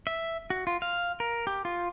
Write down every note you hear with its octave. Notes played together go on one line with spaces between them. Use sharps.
E5
F#4
F4
F5
A#4
G4
F4